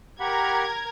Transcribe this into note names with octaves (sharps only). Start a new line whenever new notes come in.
G4 A#4 F#5 A#5 B5 G#6